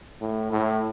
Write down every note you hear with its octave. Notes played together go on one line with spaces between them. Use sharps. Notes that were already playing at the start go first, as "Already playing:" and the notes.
A2
A2